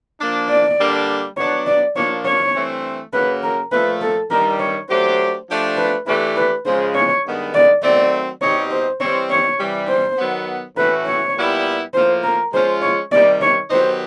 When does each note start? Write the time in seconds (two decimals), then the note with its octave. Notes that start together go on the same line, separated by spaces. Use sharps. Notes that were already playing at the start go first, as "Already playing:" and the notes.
0.20 F3 A#3 D4
0.49 D5
0.79 D3 G3 A#3 D4
1.37 F#3 B3 D4 C#5
1.67 D5
1.95 A#2 F3 A#3 D4 C#5
2.25 C#5
2.54 G2 E3 A3 C4
3.13 F#2 C#3 F#3 A#3 B4
3.43 A#4
3.72 A#2 F3 A3 B4
4.01 A4
4.30 G2 D#3 G3 A#4
4.60 C#5
4.89 F#3 A3 D4 G4 C5
5.48 F3 A3 D4 G4
5.77 B4
6.06 E3 A3 D4 G4 B4
6.36 B4
6.65 C#3 F3 G#3 C5
6.95 C#5
7.25 G2 D#3 G#3 B3
7.54 D5
7.83 D#3 F#3 A3 C4 D5
8.41 B2 G3 C4 D#4 G4 C#5
8.71 C5
9.00 E3 G3 C4 C#5
9.31 C#5
9.59 C3 E3 G3
9.89 C5
10.18 D#3 F#3 B3
10.76 A2 E3 A3 C#4 F#4 B4
11.06 C#5
11.36 A#2 G3 B3 E4 G4
11.94 A2 F3 A#3 C5
12.24 A#4
12.53 F3 G#3 C#4 F4 C5
12.82 C#5
13.12 C3 D#3 G3 D5
13.41 C#5
13.70 D#3 F#3 B3 D#4 G4 C5